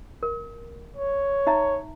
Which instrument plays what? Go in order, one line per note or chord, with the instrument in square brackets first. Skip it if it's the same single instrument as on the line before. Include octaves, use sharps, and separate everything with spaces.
[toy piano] A#4
[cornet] C#5
[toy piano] D#4 E5 A#5